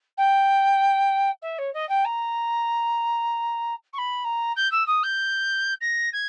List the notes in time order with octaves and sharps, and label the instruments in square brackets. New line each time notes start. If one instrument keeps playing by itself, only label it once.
[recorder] G5
E5
C#5
D#5
G5
A#5
C#6
B5
A#5
G6
E6
D#6
G6
A#6
G#6